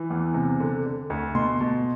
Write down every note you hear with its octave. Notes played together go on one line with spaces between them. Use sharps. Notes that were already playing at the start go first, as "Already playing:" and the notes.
Already playing: E3
E2
C3
D3
D3
D2
B2 C6
B2